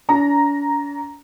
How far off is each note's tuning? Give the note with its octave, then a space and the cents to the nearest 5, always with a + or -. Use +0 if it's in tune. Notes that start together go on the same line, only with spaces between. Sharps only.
D4 -45 A#5 +0